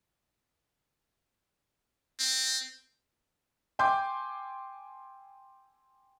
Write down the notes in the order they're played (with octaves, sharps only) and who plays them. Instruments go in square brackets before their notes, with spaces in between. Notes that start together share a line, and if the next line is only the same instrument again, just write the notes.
[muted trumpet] C4
[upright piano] G5 G#5 C6 D6 G6